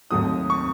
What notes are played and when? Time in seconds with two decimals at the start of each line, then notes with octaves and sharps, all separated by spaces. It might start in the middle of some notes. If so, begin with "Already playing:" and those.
0.11 D#2 D#3 F#3 A3 C4 D#6
0.50 C#6